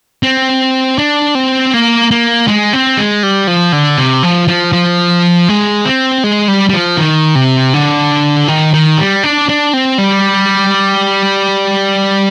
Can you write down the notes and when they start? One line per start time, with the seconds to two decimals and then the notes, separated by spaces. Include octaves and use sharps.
0.23 C4
0.98 D4
1.35 C4
1.73 A#3
2.11 A#3
2.48 G#3
2.73 C4
2.98 G#3
3.23 G3
3.47 F3
3.72 D3
3.98 C3
4.23 F3
4.48 F3
4.73 F3
5.49 G#3
5.85 C4
6.24 G#3
6.48 G3
6.69 G3
6.73 F3
6.97 D#3
7.35 C3
7.74 D3
8.48 D#3
8.73 D#3
8.98 G3
9.23 D4
9.49 D4
9.73 C4
9.98 G3